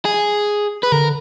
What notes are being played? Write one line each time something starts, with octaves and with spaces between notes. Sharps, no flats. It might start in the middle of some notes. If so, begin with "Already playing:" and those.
G#4
B4
D3 A#4